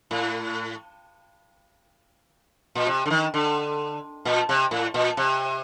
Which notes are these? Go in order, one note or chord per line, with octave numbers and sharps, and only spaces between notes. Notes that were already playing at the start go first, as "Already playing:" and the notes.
A2
A#2
C3
D3
D#3
D3
A#2
C3
A2
A#2
C3